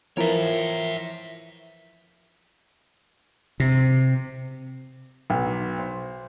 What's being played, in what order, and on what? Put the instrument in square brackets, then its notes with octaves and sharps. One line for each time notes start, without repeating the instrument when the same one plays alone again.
[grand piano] E3 F3 A#4 [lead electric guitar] C#5 E5
[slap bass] C3
[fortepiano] B1
C5